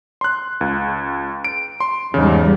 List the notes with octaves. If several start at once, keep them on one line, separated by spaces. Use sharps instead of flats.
C6 F#6
C#2
D7
C6
E2 G#2 C#3 G3